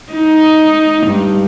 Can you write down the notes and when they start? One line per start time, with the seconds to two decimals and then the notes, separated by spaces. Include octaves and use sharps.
0.12 D#4
1.07 G2